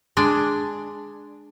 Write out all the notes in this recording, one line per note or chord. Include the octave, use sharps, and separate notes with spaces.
G#3 D4